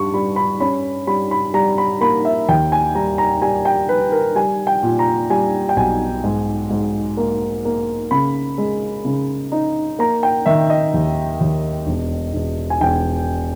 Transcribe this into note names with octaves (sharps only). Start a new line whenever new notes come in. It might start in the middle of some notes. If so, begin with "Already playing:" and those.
Already playing: G2 G3 C#6
G3 B5
B5
C#4 B5
G3 B5
B5
G3 A#5
B5
A#3 B5
E5
D#2 G5
G#5
G3 A#5
A#5
G3 G#5
G5
G3 B4
A#4
G3 G#5
G5
A#2
A#5
G3 G#5
G5
B1 G#5
G#2
G#2
A#3
A#3
C#3 B5
G#3
C#3
D#4
A#3 A#5
G5
D#3 E5
D#5
D#2
D#2
E1
E1
G#5
E1 G5